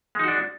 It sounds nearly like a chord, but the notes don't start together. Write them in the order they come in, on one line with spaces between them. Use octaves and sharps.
G#3 D#4 F#4 D4